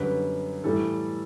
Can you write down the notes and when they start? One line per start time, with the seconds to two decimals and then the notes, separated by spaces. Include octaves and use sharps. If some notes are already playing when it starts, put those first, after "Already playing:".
Already playing: F#2 D3 G3 B4
0.63 A2 E3 G3 A4